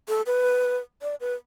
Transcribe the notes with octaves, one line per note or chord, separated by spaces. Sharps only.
A4
B4
D5
B4